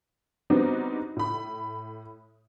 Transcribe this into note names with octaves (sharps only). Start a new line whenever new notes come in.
G3 B3 C4 D4 D#4 F#4
A2 B5